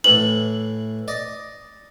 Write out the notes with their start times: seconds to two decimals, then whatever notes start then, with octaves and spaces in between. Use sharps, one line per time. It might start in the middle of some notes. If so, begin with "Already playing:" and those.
0.04 A2 E3 F#7
1.08 D5 D#5